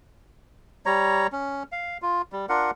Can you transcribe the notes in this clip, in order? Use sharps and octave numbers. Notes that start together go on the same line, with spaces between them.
G3 C#5 A#5
C#4
F5
F4
G3
D4 F4 A#4 F#5